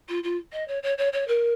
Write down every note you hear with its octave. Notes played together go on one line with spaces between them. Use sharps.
F4
F4
D#5
C#5
C#5
C#5
C#5
A#4